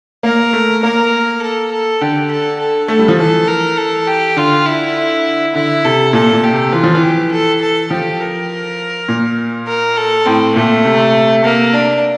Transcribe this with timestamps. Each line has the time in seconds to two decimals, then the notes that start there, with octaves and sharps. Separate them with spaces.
0.23 A#3 A#4
0.53 A3
0.83 A#3 A#4
1.42 A4
1.72 A4
2.01 D3 G4
2.31 A4
2.60 A4
2.88 A3 A4
2.99 G3
3.08 F3
3.19 E3 A4
3.48 A#4
3.77 A4
4.07 G4
4.36 D3 F4
4.66 E4
5.55 D3 E4
5.84 C3 A4
6.13 A#2 A4
6.33 A#2
6.44 G4
6.53 C3
6.73 E3 F4
6.84 F3
6.95 E3
7.03 G4
7.32 A4
7.61 A4
7.91 F3 G4
8.20 A#4
9.09 A#2
9.68 A#4
9.97 A4
10.26 A2 C4
10.56 A#2 A3
10.85 C3
11.45 A#3
11.74 D4